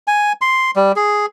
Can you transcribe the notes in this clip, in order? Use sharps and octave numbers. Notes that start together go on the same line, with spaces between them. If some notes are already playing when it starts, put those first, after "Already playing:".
G#5
C6
G3
G#4